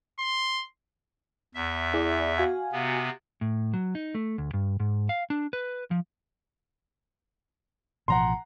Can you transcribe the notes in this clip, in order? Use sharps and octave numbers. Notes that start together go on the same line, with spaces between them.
C6
E2 E5
E4 G#4 D5
F#4 F5 G#5
C3 B3
A2
F#3
D#4
A3
D2
G2
G#2
F5
D4
B4
F3
A1 B2 F3 F#5 A#5 C6